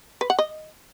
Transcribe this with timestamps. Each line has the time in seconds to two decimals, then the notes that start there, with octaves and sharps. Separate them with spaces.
0.21 B4
0.30 F#5
0.39 D#5